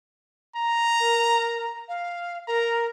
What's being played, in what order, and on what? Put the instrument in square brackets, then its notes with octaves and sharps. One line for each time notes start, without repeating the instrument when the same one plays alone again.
[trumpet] A#5
[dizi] A#4
F5
[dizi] A#4 [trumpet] A#5